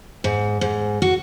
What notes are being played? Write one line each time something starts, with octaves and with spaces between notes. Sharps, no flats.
G#2
G#2
F#4